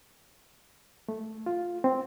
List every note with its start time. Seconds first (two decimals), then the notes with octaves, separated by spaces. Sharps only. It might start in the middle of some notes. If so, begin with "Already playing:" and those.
1.09 A3
1.46 F4
1.84 C4